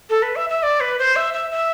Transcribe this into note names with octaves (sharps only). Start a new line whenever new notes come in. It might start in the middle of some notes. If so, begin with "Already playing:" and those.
A4
B4
E5
E5
D5
B4
C5
E5
E5
E5